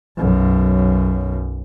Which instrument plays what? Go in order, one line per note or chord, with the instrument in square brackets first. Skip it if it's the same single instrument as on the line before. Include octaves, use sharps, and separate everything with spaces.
[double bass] B1 F#2